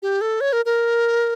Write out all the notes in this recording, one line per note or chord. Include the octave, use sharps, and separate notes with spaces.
G4
A4
C#5
A#4
A#4